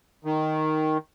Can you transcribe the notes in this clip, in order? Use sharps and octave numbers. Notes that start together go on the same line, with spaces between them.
D#3